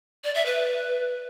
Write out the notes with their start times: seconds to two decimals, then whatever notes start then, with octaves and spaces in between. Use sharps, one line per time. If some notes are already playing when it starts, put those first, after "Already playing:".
0.24 D5
0.35 E5
0.46 B4